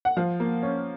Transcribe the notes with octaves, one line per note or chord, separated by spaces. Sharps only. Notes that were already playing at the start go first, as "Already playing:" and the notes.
F#5
F3 F5
A#3
C#4